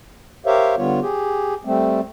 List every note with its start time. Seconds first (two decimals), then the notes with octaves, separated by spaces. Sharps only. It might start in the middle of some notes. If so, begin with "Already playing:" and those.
0.46 G4 A#4 C5 C#5 E5 F5
0.77 D3 G3 B3 F4 C#5
1.02 G4 G#4
1.65 G3 A3 C4